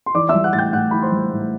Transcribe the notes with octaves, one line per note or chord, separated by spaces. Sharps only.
C6
E3 D5 D6
E5 E6
G3
F#5 F#6
A2 A6
G5 G6
A2 F#5 F#6
E3 B5
C5 C6
G3
A2